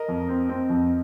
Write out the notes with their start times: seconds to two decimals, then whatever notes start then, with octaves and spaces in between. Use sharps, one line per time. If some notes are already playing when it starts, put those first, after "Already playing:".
Already playing: A#4 D#5
0.08 F2
0.29 C4
0.49 C4
0.70 F2